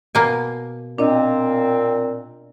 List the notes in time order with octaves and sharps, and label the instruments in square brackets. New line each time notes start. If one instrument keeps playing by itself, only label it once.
[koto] B2 A#3 G#5
[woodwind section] A#2 C4 [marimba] D4 D#5